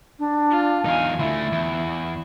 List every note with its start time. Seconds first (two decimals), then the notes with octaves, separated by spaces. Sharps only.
0.19 D4
0.50 F4
0.86 E2 D#4 F5 G#5
1.19 D2 A3 E4 E5
1.52 E2